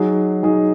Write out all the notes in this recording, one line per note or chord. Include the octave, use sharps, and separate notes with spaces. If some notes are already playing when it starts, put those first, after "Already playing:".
Already playing: F#3 D#4 G#4
F#3 D#4 G#4